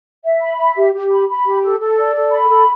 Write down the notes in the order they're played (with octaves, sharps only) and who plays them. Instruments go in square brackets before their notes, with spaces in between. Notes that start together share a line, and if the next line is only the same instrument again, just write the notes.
[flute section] E5
B5
E5
G4
G4
B5
B5
G4
A4
A4
D5
A4
B5
A4